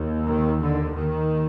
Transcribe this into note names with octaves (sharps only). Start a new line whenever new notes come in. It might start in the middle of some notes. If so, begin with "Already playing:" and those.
Already playing: D#2
D#3
D3
D#2 D#3